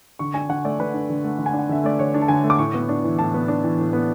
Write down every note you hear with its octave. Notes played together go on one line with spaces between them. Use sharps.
D3 C#6
D4 G#5
D3 F#5
A3 D5
D3 B4
D4
D3
A3
D3
G#5
D4
F#5
D3 E5
A3 D5
D3 C#5
D4
A5
D3 G#5
A3
D6
A2 C#6
B3
D4
E3
A2 A5
B3
D4
E3
A2
B3